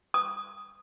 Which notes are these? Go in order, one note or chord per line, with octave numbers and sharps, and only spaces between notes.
D#6